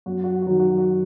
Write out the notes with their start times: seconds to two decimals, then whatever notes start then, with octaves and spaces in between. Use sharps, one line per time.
0.06 F#2 F#4
0.24 F#4
0.42 F#4
0.47 D#3 F#3
0.59 F#4
0.78 F#4